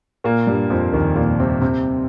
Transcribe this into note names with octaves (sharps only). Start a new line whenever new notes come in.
A#2 A#3
G2 G3
F2 F3
D#2 D#3
A#2 A#3
C3 C4
C3 C4